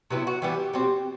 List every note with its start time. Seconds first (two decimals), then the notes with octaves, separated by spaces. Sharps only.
0.10 C3 F#3 B3 E4
0.27 F#4
0.42 E3 G3 B3 G4
0.73 B2 G3 C4